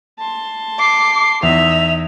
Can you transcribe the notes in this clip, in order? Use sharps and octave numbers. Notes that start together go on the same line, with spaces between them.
A5 C6
D6 C7
E2 D#4 D#5 E5 F7